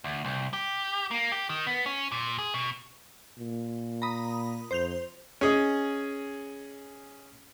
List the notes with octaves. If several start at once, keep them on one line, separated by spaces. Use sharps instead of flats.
D2
C2
G4
A#3
G4
D#3
B3
C#4
A#2
G#4
B2
A#2
A#5 B5 D#6
F2 C5 G6 F7
C#4 G#4 D#5